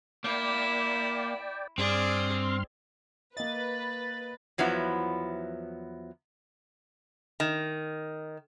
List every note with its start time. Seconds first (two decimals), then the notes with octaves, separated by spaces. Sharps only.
0.24 A#3 E4 D5 G5
1.78 G2 C4 G#4 D5 C6 F6
3.37 A#3 B4 D#5 A6
4.58 E2 F3 F#3 B3 E4
7.40 D#3